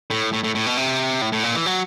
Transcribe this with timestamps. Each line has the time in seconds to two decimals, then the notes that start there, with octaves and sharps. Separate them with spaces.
0.10 A2
0.33 A2
0.44 A2
0.55 A2
0.66 B2
0.77 C3
1.22 A2
1.32 A2
1.43 A#2
1.54 E3
1.66 F#3